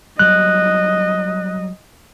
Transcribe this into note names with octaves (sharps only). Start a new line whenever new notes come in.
F#3 G3 D#5 F#6